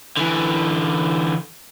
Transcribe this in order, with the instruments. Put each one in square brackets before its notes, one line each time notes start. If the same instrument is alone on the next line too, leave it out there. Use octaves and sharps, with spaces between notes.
[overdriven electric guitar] D3 E3